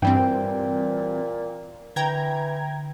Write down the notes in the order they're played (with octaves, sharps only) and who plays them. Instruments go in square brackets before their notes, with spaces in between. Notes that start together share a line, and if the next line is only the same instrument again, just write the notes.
[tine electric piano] G2 G5 [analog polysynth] E3 G3 C4
[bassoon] A#2 [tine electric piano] G5
[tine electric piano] D3 [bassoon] E3 [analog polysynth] G5 A#5 G#6